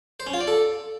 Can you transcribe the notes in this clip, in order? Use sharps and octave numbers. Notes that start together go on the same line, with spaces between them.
C5
C#4
F4
D5
A4